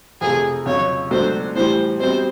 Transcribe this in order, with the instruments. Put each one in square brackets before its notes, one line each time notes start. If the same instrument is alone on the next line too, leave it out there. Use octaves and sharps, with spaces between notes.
[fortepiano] F2 C3 F3 A3 [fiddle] G#4
[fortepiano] F2 C#3 F#3 [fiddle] C#5
[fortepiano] C#2 B2 F#3 A3 D4 [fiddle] C5
[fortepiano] A2 E3 G3 [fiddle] C5
[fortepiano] B2 G3 C4 [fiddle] C5